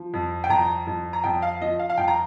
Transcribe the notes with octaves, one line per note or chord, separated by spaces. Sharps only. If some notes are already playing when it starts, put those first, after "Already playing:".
Already playing: F3
F2
G5
F2 A#5
F2
A#5
F2 G5
F5
F3 D#5
F5
F5
F2 G5
A#5